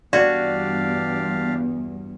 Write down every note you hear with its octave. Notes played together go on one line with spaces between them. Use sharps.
E2 G2 D4 F#4 G4 D5 F5